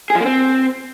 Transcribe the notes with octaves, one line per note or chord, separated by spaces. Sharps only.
G#4
F3
A#3
C4